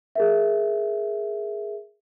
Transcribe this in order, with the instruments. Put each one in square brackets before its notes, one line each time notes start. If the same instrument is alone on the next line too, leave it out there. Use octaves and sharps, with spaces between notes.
[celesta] G#4 A#4 E5